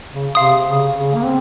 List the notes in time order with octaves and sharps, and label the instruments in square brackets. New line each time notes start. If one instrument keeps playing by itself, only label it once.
[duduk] C#3
[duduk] C3 [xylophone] F5 C6 D#6
[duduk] C#3
C#3
A#3
C4